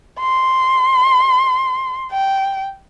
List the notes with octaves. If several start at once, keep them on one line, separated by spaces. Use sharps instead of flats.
C6
G5